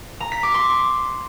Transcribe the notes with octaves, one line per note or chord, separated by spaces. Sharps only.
A#5
B6
D6
C6